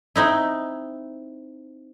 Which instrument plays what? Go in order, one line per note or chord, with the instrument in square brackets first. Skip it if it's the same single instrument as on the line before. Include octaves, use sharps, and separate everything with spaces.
[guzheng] C4 D#4 E4